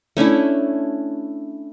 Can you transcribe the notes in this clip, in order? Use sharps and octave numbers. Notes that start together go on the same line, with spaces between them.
A3 C#4 D4 E4